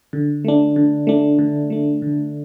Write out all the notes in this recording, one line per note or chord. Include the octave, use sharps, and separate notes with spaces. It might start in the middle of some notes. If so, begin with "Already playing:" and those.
D3
A3 D4
D3
A3 D4
D3
A3 D4
D3